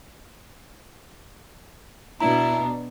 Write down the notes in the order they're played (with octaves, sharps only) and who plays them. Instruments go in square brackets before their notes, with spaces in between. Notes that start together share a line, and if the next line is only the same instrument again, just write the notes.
[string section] B2 B3 D4 [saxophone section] E4 [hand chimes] A#5